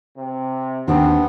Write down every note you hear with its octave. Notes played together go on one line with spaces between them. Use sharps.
C3
D#2 B3 C4 D4